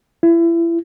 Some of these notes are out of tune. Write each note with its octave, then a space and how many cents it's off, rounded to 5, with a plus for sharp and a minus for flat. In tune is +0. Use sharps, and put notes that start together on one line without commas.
E4 +30